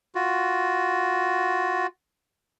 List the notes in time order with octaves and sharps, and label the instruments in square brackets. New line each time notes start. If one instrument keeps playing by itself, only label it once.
[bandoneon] F4 F#4